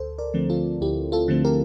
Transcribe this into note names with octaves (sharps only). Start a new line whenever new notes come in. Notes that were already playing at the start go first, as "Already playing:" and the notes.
Already playing: D2 A4 C5
A#4 D5
D3 F3 A3 C4
F4 A4
D2 E4 G4
F4 A4
D3 F3 A3 C4
G4 A#4